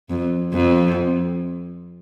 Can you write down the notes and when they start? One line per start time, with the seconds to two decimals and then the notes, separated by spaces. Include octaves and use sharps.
0.09 F2
0.53 F2